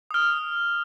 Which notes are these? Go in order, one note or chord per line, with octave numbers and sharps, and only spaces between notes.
D#6 F6